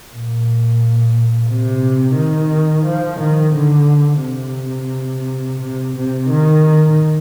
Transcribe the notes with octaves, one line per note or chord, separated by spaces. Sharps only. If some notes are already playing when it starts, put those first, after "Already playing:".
A#2
C3
D#3
F3
D#3
D3
C3
C3
C3
D#3